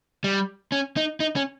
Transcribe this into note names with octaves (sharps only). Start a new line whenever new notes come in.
G3
C#4
D#4
D#4
C#4